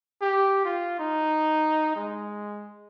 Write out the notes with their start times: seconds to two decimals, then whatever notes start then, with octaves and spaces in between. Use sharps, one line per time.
0.22 G4
0.65 F4
1.00 D#4
1.96 G#3